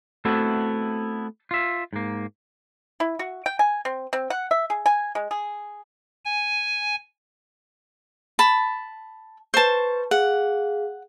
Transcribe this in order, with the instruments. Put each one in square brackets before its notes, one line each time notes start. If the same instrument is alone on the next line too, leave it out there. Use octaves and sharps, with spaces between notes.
[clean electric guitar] A3 B3 C4 E4 F#4 A4
F4 E5
G#2 A#3
[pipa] E4
F#4
G5
G#5
C4
C4
F#5
E5
G#4
G#5
G#3
G#4
[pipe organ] G#5
[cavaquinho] A5 B5
[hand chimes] B4 C#6 [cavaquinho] C5 A5
[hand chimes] G#4 F5 [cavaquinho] F#5